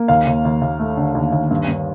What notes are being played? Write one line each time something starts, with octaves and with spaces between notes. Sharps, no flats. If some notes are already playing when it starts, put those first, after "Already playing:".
Already playing: A#3
D#2 F5
D#2
D#2
D#2
A3
D3
D#2
D#2
G2
G2